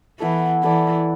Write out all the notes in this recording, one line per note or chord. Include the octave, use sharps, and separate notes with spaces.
E3 B3 E4 A4
E3 E4 A4 D5